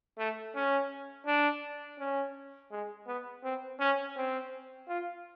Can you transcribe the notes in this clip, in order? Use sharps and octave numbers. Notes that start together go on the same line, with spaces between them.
A3
C#4
D4
C#4
G#3
B3
C4
C#4
C4
F4